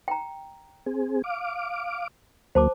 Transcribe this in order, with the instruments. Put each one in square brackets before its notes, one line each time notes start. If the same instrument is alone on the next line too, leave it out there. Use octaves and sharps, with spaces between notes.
[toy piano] G5 A#5
[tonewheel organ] C4 G#4
F5 D6
[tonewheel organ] D2 F#3 A#3 [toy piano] C5 A5 D6